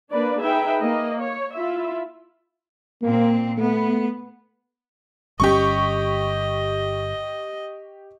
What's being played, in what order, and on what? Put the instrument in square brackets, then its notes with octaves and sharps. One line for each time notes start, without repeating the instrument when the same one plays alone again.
[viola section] A#3 D4 B4 D5
D#4 G#4 B4 E5 G5
A#3 D#5
C#5
E4 F4 E5
[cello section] A#2 C4 [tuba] A#3
[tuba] A3 [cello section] B3
[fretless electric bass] G1 G3 C#4 [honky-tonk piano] G4 C#6 [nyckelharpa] D#5